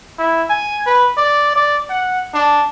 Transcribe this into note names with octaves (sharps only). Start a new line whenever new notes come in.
E4
G#5
B4
D5
D5
F#5
D4